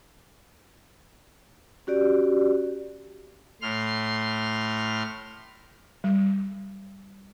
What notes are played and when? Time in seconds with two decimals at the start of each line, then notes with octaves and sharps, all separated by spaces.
1.87 C#4 F#4 G4 D5
3.62 A2 C6 F6
6.04 G3